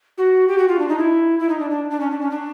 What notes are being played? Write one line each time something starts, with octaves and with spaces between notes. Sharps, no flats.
F#4
G4
F#4
F4
D4
D#4
E4
E4
D#4
D4
D4
D4
C#4
D4
C#4
D4